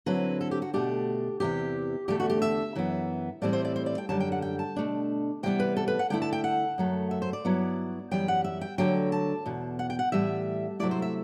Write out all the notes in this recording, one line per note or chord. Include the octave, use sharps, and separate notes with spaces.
D3 F#3 C4 E4 B4
A4
G4
F#4
B2 A3 D4 G4
E2 C3 E3 G4
E2 D3 A3 G4
F#4
G4
E5
F#2 E3 B3
A2 E3 G3 C4 E4 D5
C5
D5
C5
D5
G5
F#2 D3 G3 A5
G5
F#5
G5
A5
B2 A3 D4
C3 E3 G3 B3 G5
B4
A4
B4
F#5
D3 A3 E4 G5
A5
G5
F#5
F#2 F#3 A3
E5
C5
D5
G2 F#3 B3 E4
F#2 E3 G3 G5
F#5
E5
G5
D2 D3 F#3 G5
A5
E2 B2
F#5
G5
F#5
A2 E3 G3 E5
C3 F#3 A3 E4 D5
C5
E5